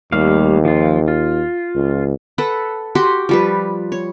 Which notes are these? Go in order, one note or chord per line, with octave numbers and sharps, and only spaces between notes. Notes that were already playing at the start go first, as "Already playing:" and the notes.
D#2 G3 A3 F5
F3 F4
F4
C#2
A4 B4 F#5
F#4 G4 F#5 C6
F3 G3 B4
C#5